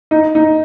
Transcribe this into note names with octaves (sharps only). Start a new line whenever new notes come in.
D#4
D#4